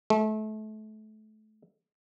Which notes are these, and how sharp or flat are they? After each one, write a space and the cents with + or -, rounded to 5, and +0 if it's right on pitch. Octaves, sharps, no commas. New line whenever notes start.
A3 -30